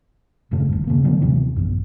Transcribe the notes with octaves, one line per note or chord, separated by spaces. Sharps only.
D#1 F#2 C#3 A3
D#1 G2
C#3 A#3
D3 F#3 A3 B3
D#2 C3 E3
A#1 F#2